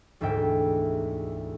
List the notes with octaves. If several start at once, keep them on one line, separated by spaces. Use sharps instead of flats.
E1 D2 G#2 E5 G5